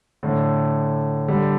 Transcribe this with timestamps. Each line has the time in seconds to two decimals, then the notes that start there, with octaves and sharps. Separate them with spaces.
0.23 A2 D3
1.28 D3 G3